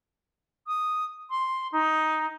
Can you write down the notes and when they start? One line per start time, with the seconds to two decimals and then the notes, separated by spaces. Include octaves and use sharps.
0.67 D#6
1.30 C6
1.72 D#4